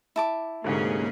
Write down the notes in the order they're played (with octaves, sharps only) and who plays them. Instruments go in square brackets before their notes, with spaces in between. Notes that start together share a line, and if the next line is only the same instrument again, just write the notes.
[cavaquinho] E4 A5 D6
[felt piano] D2 G#2 C3 [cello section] A#3 C#4 G#4